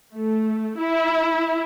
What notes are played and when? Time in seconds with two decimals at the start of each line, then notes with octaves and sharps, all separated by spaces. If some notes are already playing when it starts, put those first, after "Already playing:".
0.15 A3
0.77 E4